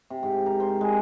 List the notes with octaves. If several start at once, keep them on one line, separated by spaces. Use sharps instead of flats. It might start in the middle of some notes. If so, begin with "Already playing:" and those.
C3
G#2
A#4
C5
G#3